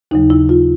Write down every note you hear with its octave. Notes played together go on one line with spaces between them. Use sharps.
D#2 C#3 F#3 D#4
E4
F4